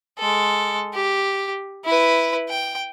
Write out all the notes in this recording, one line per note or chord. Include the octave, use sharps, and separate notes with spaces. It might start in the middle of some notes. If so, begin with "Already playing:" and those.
G#3 A4
G4
E4 B4
G5